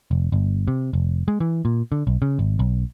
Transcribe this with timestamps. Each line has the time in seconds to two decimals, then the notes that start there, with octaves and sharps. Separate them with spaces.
0.11 F1
0.32 G1
0.68 C3
0.93 F1
1.28 G#3
1.40 E3
1.65 A#2
1.92 D3
2.07 B1
2.22 C#3
2.39 G#1
2.59 B1